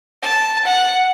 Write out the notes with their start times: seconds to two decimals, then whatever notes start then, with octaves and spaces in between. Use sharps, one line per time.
0.22 A5
0.65 F#5